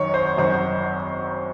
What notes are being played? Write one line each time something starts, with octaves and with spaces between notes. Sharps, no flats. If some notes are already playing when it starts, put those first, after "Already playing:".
Already playing: G#1 F#2 D#3 C#5
C5
G#1 F#2 D#3 C5